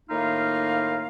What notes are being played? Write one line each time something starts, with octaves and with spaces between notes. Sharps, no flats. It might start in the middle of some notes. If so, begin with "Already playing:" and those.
A2 D#3 A#3 D#4 F4 F5